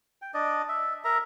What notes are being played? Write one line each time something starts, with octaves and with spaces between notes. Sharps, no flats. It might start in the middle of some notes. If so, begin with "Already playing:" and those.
G5
D4 D5 D#5
E5
A#4 E5 A#5